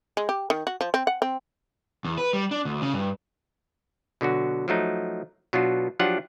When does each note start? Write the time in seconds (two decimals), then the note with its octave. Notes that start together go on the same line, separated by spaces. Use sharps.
0.17 G#3
0.29 G4
0.50 D#3
0.67 F#4
0.81 F3
0.94 C4
1.07 F#5
1.22 C4
2.05 E2
2.18 B4
2.33 G3
2.51 D4
2.65 D2
2.82 C#3
2.94 G2
4.21 B2 D3 F#3 F#4
4.68 F3 F#3 A3 D#4
5.53 B2 F#3 B3 D4 F4 F#4
5.99 F3 F#3 D4 F4 G4 F#5